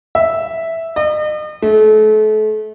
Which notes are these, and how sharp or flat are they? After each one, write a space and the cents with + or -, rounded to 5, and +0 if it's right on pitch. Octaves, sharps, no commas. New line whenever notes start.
E5 -5
D#5 -40
A3 -35